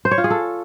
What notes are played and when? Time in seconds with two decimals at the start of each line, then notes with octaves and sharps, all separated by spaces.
0.05 C5
0.11 C#5
0.18 F4
0.24 G#4
0.30 A4